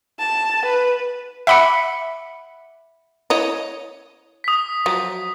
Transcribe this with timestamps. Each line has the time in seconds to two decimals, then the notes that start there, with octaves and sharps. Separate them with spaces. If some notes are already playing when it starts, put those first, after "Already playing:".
0.19 A5
0.65 B4
1.47 E5 F#5 B5 D6 C#7
3.30 E4 C#5 D#5
4.44 D#6 B6
4.86 F3 F#3